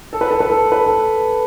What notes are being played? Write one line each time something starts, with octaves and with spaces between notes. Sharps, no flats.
A4
B4
A4
B4
A4
B4
A4